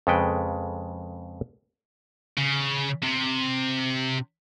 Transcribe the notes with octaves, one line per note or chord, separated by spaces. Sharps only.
F2 C#3 G#3 A4 B4 G5
C#3
C3